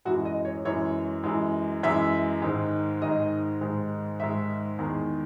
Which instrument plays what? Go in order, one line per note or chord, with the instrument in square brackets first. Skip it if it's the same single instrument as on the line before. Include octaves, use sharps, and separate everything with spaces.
[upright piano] F#2 E3 G#3 F#4
D#5
C#5
F#2 E3 G#3 C#5
F#2 E3 G#3
F#2 E3 G#3 E5
G#2 D#3 G#3
G#2 D#3 G#3 D#5
G#2 D#3 G#3
G#2 D#3 G#3 E5
E2 D#3 G#3